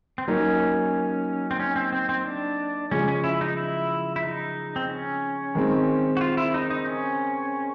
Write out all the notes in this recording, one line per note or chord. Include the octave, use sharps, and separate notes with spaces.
C4
F#3 A#3 C#4 D#4 F#4 A#4
C4
C#4
C4
C4
C4
D4
C#3 F3 G#3 C#4
C#4
E4
D#4
E4
E4
D#4
C4
C#4
D#3 G#3 C4
F#4
F4
E4
D#4
D#4
C#4